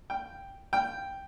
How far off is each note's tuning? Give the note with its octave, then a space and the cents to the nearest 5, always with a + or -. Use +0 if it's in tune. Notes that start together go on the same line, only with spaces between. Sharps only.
G5 +0
G5 +0